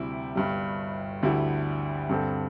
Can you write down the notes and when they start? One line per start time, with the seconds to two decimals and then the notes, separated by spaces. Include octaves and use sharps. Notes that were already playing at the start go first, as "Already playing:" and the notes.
Already playing: D2 C3 G3 E4
0.35 G1 G2 G3
1.23 D2 D3 G3 E4
2.09 G2 D3 C4 A4